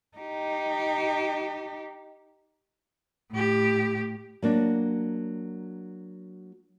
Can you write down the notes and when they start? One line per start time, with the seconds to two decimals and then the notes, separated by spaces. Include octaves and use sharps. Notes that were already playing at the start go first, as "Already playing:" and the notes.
0.18 D#4 G4
3.32 A2 G4
4.42 F#3 A#3 D4